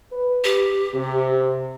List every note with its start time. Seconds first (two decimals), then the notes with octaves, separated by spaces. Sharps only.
0.13 B4
0.44 G4
0.95 C3